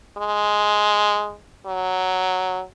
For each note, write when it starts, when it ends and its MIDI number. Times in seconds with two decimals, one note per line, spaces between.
0.17 1.35 56
1.66 2.62 54